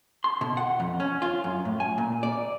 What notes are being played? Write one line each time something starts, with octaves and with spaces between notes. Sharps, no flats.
C6
B2
F#5
F2
C#4
F4
F#2
A2
G#5
A#2
D5